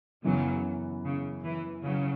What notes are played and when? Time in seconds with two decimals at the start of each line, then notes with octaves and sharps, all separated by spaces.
0.24 F#2 C#3 E3 F#3 B3
1.04 C#3
1.44 E3
1.83 C#3 F#3